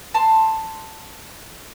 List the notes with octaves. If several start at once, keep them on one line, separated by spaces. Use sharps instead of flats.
A5 C6